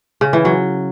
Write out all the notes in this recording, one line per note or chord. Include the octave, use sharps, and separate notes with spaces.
C#3
E3
F#3